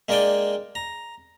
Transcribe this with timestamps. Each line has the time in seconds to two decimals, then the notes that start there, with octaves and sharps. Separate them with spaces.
0.09 G#3 A#3 D4 D5 G5 G#5
0.75 A#5